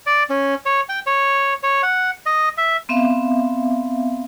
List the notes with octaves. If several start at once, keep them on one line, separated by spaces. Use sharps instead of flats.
D5
C#4
C#5
G5
C#5
C#5
F#5
D#5
E5
B3 C4 E5 F5